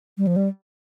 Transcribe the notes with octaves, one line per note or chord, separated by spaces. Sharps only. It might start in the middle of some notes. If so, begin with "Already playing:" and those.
G3
F3
G3